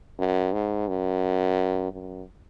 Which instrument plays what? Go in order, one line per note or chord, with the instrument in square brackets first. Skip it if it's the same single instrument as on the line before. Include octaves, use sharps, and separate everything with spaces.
[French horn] F#2
G#2
F#2
F#2